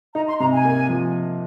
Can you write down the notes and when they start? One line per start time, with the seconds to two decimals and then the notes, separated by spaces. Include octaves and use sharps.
0.14 D#4 A#5
0.27 C6
0.40 C3 A#5
0.52 G#5
0.64 A#3
0.89 F3